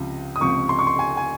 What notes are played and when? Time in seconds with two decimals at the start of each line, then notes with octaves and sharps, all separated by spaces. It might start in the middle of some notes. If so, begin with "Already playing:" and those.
Already playing: C#2 C3 F3
0.36 D#6
0.41 C#2 C3 F3 C#6
0.69 C6
0.79 C#6
0.87 C6
0.99 G#5
1.17 G#5